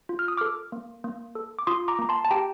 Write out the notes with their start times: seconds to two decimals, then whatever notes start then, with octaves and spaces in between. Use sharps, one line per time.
0.09 F4
0.19 F6
0.28 D#6
0.37 A4 D6 F6
0.72 A#3
1.04 A#3
1.35 A4
1.59 D6
1.67 F4 C6 D#6
1.88 A#5 D6
1.99 A#3 A#5
2.09 A5 C6
2.25 A5
2.31 G4 G5 A#5